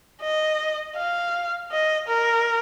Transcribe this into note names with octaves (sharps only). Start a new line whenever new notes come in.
D#5
F5
D#5
A#4